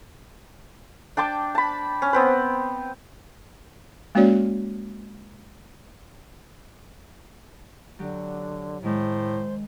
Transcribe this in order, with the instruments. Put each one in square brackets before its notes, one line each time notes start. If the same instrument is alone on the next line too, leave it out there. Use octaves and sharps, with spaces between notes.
[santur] D4 G5 A5 D6
A5 B5
C#4
B3 C4 B4
[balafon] G#3 A#3 C#4 F#4 C#5 D5
[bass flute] D3 [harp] F#3 G4
[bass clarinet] A2 [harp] D#3 G#3 [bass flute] C5